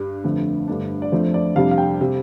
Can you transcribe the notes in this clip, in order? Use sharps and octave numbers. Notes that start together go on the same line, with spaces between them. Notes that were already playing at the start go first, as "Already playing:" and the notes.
Already playing: G2 G3 D4
G1 F2 D3 A3
G1 G2 D3 A3 D4
D5
F2 F3 A3 D4 C5
D5
F2 C3 G3 D4 F5
F5
G5
C3 G3